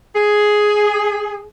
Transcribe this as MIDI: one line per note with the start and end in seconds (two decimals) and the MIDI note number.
0.15 1.44 68